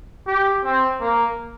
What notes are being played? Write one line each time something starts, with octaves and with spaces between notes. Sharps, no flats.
G4
C4
A#3